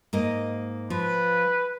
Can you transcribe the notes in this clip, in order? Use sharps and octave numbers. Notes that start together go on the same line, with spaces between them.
G#2 A#3 D#5
F3 B4